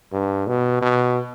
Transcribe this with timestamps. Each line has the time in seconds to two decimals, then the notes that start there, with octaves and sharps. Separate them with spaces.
0.13 G2
0.47 B2
0.82 B2